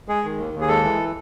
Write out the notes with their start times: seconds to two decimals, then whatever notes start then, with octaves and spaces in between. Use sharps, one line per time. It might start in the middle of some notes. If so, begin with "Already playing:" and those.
0.08 G#3 G#4
0.24 D#3
0.38 D#2
0.54 D#2
0.61 G#4
0.68 G#3 A4
0.84 E3